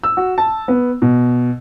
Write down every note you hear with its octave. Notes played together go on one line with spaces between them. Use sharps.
E6
F#4
A5
B3
B2